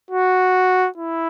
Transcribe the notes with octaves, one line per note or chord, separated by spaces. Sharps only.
F#4
E4